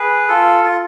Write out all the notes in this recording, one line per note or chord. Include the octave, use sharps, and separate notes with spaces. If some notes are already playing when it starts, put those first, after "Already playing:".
Already playing: G#4 B4
F4 A4
F4